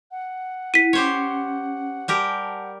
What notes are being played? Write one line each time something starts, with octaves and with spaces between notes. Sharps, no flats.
F#5
E4 B6 D#7
C#4 G4 C5 C#5
G3 G4 A#4 G#5 A5